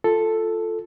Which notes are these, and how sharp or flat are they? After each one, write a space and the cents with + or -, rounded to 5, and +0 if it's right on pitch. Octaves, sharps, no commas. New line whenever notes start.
F4 +0 A4 +0